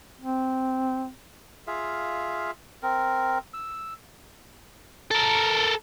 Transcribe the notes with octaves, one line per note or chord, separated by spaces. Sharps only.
C4
F4 G#4 E5 F5
C4 A#4
E6
A4 A#4